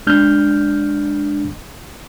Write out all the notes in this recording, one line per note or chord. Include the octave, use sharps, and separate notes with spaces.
G#3 D4 F6 G6